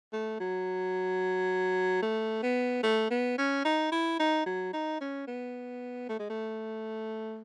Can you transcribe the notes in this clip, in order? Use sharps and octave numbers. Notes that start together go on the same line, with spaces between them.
A3
F#3
A3
B3
A3
B3
C#4
D#4
E4
D#4
F#3
D#4
C#4
B3
A3
G#3
A3